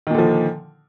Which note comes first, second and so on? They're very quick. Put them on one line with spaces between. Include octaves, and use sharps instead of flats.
D#3 A#2 D3 F3